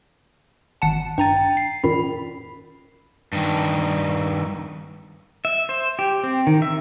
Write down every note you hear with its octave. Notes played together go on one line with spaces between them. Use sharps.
G#1 F#5 A5
G2 G5 A#5 A6 D#7
C7
F#2 A#2 D#3 B5
G2 D#3
E5
C5
G4
C4
D#3
E5